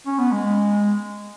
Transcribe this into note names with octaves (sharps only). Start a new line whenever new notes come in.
C#4
B3
G#3